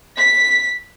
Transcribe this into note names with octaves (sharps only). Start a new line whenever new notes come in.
B6